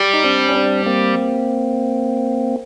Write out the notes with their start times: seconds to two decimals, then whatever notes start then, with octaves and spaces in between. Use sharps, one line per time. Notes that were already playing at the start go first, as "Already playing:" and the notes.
Already playing: G3
0.13 D#4
0.24 C4 D4
0.48 C#4
0.55 C4 D4
0.86 A#3 C4